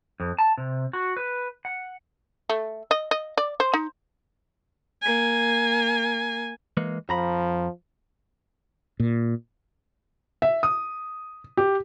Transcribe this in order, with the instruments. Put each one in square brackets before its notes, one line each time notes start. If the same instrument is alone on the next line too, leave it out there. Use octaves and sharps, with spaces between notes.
[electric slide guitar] F2
A5
C3
F#4
B4
F#5
[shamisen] A3
D#5
D#5
D5
C5
D#4
[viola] A#3 G#5
[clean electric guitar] E3 G#3 A#3
[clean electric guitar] F2 A#5 B5 [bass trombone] F3
[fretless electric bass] A#2
[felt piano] E5
D#6
G4